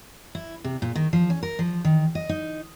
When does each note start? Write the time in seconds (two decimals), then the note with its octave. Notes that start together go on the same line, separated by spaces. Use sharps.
0.35 E4
0.64 C3
0.82 A#2
0.96 D#3
1.13 F3
1.30 C#4
1.43 A#4
1.59 F3
1.85 D#3
2.15 D#5
2.29 D#4